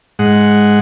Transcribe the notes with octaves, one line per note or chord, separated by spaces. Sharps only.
G#2 G#3 F#5